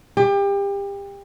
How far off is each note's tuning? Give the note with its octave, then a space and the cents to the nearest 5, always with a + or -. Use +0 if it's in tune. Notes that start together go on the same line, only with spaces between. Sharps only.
G4 +30